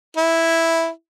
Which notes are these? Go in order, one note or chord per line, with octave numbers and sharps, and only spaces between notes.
E4